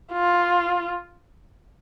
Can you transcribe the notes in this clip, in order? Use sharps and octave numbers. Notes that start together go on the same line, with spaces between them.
F4